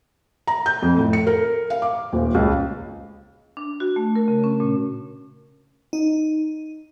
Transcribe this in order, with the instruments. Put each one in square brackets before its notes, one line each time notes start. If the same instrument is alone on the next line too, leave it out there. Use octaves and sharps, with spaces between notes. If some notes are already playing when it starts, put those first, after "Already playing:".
[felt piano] A#5
G6
F2
A2
C#7
A#4
F5
D6
D#1
C#2
[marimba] D4
F#4
A3
A#4
C#3
C#4
A#2
[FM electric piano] D#4